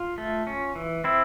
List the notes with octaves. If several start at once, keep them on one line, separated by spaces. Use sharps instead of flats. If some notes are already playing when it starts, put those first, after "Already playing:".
Already playing: F4
A3
C#4
E3
C4 E4